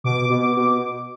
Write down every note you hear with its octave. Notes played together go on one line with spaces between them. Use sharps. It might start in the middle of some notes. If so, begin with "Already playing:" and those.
B2 D6
B2
B2